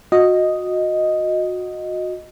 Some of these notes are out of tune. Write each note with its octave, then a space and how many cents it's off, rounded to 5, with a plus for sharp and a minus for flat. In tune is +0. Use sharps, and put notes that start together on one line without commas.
F#4 -25 D#5 +0